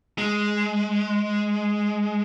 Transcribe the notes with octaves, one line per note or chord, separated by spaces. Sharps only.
G#3